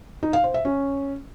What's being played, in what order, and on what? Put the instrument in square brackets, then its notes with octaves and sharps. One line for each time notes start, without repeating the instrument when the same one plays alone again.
[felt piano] D#4
F5
C5
E5
C#4